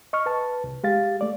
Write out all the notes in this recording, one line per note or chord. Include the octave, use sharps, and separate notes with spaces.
D#5 C#6 F6
B4 A5
C2
G#3 G4 F5 A6
A3 D5